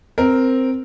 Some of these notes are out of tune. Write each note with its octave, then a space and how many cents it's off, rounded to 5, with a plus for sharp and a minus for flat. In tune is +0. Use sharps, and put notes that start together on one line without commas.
C4 +0 A#4 +0